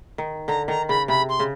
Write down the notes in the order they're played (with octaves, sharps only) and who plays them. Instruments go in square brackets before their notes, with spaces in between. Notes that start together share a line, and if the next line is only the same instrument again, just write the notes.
[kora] D#3
[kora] D3 [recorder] A#5
[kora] D#3 [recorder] A#5
[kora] C#3 [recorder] B5
[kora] C3 [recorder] B5
[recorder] C6
[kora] C#3